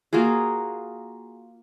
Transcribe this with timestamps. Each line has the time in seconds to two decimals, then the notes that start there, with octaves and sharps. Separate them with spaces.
0.13 A#3 F4 F#4 G#4